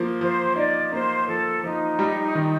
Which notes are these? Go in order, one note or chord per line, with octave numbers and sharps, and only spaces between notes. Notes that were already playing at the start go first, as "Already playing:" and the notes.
Already playing: F3 A#3
F3 C5
D#4 D5
A#3 C5
F3 A4
F3 D#4
G3
D#3